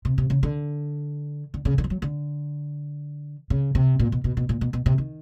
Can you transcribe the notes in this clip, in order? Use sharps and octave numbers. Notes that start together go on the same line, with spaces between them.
C3
C3
C#3
D3
D3
C#3
D3
F3
F#3
D3
C#3
C3
A#2
B2
B2
B2
A#2
B2
B2
C3
D#3